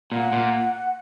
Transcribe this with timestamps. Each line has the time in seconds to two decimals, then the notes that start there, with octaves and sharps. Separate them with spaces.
0.12 A#2 F#5
0.32 A#2